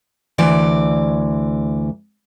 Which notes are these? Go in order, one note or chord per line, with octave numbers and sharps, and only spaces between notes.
D2 E3 D5